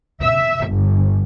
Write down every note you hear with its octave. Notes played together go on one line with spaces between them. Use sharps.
E5
G1